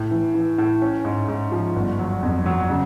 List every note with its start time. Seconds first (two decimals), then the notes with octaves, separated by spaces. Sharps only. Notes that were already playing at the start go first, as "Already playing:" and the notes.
Already playing: A2
0.11 E3
0.34 E3
0.58 A2
0.82 C#4
1.05 G#2
1.28 G#2
1.52 F3
1.76 G1
1.99 F#3
2.23 F2
2.46 F#3
2.70 C#3